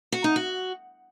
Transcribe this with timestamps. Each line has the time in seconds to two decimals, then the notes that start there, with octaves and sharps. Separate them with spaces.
0.12 F#4
0.24 D#4
0.36 F#4